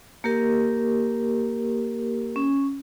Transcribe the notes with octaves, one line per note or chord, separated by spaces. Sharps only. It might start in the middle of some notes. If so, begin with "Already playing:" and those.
A#3 G4 A#4
C#4